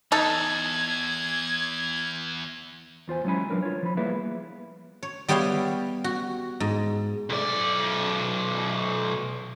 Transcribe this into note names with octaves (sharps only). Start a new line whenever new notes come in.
E2 D#4 A4 G#6
E2 F4 C5 G#5
F#3 G#3 C#4 E4 G#5 B5
F#3 D4 A#4 B4
F4 C#5
F3 B5
G3 A#3 B3 E4 G#4 B4
C#5
G3 B3 G4 C#5 E5 F5
F#4
G#2
B1 D5